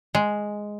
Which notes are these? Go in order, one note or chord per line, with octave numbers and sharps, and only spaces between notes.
G#3